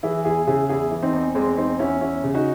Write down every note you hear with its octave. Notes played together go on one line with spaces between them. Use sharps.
E3 E4 G#4
E2 E4 G#4
C#3 E4 G#4
E2 E4 G#4
E3
C4 D#4
E2
E2 G#3 C4
E2 C4 D#4
E2 C#4 E4
E2 C#4 E4
C#3
D#4 F#4